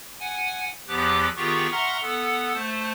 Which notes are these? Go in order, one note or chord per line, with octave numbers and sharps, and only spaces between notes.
F#5 G#5
E2 F3 B3 G4 D6 F#6
D#3 B3 F4 G4 G#4 C#6
E5 F#5 A#5 C6 C#6 F6
B3 A4 F#5
A3 C5 A5